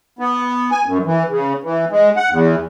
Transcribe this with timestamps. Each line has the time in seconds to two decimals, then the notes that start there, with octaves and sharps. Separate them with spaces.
0.19 B3
0.71 G#5
0.85 F#2
1.05 E3
1.29 C#3
1.64 E3
1.91 G#3
2.16 F#5
2.30 E2